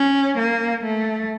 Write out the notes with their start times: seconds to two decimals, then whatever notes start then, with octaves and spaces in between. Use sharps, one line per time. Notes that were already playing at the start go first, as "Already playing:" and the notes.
Already playing: C#4
0.38 A#3
0.84 A3